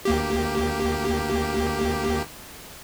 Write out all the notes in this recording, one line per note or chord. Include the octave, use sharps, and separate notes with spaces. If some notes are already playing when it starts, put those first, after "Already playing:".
D2 A#3 G4